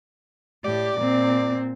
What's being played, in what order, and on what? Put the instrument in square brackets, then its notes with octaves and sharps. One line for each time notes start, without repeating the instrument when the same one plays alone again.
[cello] A2 G4 [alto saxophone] D5
[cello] A#2 C4